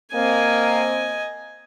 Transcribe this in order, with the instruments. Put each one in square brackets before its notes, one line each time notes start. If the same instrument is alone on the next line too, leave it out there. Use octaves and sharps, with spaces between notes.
[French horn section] A#3 C4 [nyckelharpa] D#5 G#5